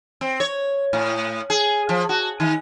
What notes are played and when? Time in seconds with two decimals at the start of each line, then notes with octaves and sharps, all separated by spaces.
0.21 C4
0.40 C#5
0.93 A2
1.50 G#4
1.89 F3
2.09 F#4
2.40 D#3